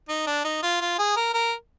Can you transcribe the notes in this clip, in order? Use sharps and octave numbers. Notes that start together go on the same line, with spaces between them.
D#4
D4
D#4
F4
F4
G#4
A#4
A#4